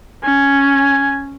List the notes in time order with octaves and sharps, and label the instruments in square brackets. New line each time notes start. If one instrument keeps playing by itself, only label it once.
[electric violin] C#4 [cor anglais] G#5